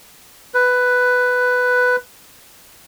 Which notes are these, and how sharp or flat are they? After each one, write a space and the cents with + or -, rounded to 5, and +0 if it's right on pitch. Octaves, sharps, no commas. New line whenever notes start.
B4 +5